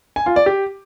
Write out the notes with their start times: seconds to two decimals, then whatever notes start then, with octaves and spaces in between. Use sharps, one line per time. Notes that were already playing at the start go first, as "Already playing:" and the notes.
0.16 G#5
0.26 F4
0.36 D5
0.46 G4